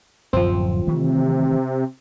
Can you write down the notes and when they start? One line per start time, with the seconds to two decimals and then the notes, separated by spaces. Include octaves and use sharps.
0.33 D1 F#2 F3 C4
0.87 C3 D#3 E3 A3